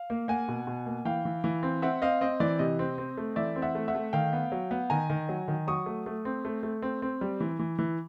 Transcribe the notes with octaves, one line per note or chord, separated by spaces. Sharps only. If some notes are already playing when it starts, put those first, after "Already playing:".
Already playing: F5
A#3
A#3 F#5 G#5
B2
B2
A#3
E3 F5 G5
E3
E3
C4
C4 E5 F#5
C4 D#5 F5
C4 D#5
E3 D5
C3 D#5
C4
C4
A3
E3 D5 E5
C4
E5 F#5
A3
E5 F#5
A3
D#3 F5 G5
B3
F#3
B3
D#3 G#5 A#5
D#3
F#3
D#3
F#3 C#6 D#6
A3
A3
C4
A3
A3
C4
C4
G3
E3
E3
E3